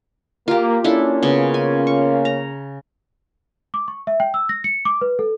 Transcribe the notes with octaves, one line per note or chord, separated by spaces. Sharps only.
A#3 F4 G4
A#3 C#4 D4 E4 F4 A4
C#3 B3
G#5
C#6
A#5
D6
C#6
E5
G5
E6
A#6
C#7
D6
B4
A4